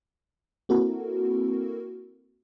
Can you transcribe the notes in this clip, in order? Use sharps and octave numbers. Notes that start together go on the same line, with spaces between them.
A#3 C4 E4 F#4 A4 A#4